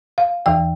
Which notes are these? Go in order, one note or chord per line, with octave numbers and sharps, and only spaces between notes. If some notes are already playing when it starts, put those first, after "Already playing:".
F5
E2 E3 G5